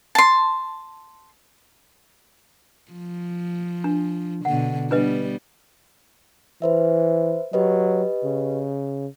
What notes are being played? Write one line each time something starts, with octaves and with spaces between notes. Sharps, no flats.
A5 C6
F3
D4
B2 D3 F#5
G3 B3 D4 B4 D#5
E3 B4 C5 E5
F#3 G4 B4 D#5
C#3